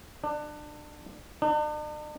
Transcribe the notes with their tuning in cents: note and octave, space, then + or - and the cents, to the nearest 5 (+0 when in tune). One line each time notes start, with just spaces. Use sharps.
D4 +25
D4 +45